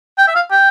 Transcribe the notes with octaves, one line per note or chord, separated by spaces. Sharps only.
G5
E5
F5
G5